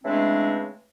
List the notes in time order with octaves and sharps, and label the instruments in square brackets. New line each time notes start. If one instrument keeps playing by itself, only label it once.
[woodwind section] C#3 E3 G#3 A3 C4 D4